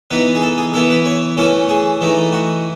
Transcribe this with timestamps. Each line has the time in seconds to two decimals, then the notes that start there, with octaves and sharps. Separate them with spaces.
0.11 E3 B3 D#4 B4
0.35 G#4
0.42 A4
0.58 G#4
0.74 E3 B3 E4 A4
0.90 B4
1.06 C#5
1.37 E3 A3 C#4 A4
1.69 G#4
2.01 E3 A3 D#4
2.32 F#4